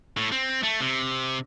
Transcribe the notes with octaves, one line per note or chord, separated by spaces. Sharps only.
A2
C4
A3
C3